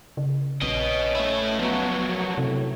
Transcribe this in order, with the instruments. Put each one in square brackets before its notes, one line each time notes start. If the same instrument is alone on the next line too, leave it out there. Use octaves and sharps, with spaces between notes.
[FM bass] C#3
[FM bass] A#1 [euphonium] C#4 [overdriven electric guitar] B4 D#5
[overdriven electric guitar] A3 E4
[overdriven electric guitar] F3 F#3 [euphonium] B3
[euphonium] F#2
[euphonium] A2 [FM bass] C3